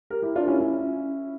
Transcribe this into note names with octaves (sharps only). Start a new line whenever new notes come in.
G4 A#4
E4 G4
D4 F4
C#4 E4
C#4 E4